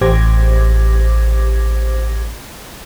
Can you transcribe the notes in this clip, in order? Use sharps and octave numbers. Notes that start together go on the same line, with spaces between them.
A1 G4 C5 D6 G#6 A#6